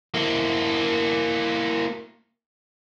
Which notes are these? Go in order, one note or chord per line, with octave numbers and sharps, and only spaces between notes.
A#3 E4